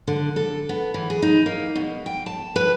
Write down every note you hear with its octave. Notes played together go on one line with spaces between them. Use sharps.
D3
A4
B3
E3
G#4
D#4
A#3
B2
G5
A5
B4